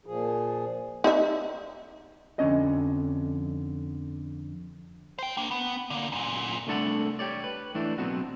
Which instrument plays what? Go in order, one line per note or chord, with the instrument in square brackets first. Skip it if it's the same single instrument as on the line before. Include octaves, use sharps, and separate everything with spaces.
[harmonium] A#2 F3 G#4
[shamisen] D#4 E5
[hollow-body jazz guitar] F2 D3 C#4 D#5
[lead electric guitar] C5 G5
A#3 D4
B3
D3 A#3
F#2 A#2
[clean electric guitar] C2 A3 D4 A4 F#5 B5
G4 C#5 D5
B4
E3 A3 D4 E4
B2 F#3 B3 C4 F#4